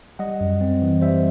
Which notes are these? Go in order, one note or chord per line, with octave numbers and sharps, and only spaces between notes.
G3 D#5 F#5
F#2
C4
E3
G3 C5 E5